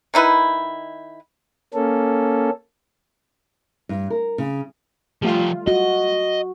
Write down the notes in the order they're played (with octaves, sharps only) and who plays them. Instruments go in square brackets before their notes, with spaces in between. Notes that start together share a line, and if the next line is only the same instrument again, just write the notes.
[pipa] D#3 D#4 E4 B4
[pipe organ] A#3 C#4 A4
[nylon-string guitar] G2
A#4
C#3
[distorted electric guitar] F3 G4 [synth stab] G3 A3 F4
[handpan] F#4 [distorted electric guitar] D#5